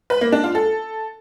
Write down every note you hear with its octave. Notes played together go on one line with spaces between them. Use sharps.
B4
A#3
D4
F4
A4